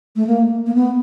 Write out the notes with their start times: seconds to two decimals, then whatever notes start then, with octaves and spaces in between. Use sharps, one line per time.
0.16 A3
0.27 A#3
0.66 A#3
0.74 B3